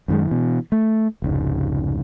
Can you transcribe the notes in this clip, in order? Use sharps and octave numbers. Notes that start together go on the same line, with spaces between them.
F#2 D#3 G#3
B2 E3
A3
F1 C#2 G#2